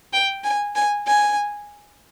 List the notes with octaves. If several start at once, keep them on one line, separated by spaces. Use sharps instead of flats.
G5
G#5
G#5
G#5